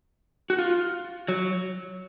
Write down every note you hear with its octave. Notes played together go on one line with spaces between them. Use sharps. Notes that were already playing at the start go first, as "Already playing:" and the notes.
F#4
F4
F#3